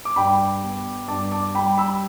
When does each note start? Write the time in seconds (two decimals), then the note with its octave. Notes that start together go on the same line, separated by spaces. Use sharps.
0.05 D6
0.16 G2 G5 B5
0.63 B3
1.08 G2 A5 D6
1.31 A5 D6
1.55 G3 G5 B5
1.78 B5 E6